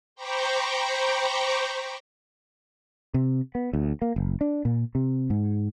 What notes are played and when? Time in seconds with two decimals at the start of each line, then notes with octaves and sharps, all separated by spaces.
0.16 C5 G5 A#5 B5 C#6 D6
3.14 C3
3.55 B3
3.73 D2
4.02 A#3
4.16 F#1
4.41 D4
4.65 A#2
4.95 C3
5.30 G#2